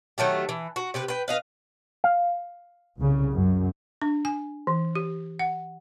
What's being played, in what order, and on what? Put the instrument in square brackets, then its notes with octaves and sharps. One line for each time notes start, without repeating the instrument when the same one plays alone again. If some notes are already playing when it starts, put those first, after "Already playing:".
[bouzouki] D#3 F#3 A3 G4
E3
F#4
C3 G4 B4
B4 G5
B4 D#5 F5
[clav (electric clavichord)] F5
[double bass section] C2 C#3
F#2
[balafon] D4
G#5
E3
G4
F#5